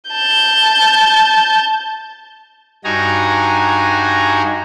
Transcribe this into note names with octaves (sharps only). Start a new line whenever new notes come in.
A5 G6
G2 D#4 F#4 G#5 A#5